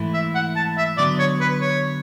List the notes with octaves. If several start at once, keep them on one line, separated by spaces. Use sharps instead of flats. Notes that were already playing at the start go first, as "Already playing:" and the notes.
Already playing: G#2 E3 A3 E4
E5
F#5
A5
E5
D3 F#3 B3 D5
C#5
B4
C#5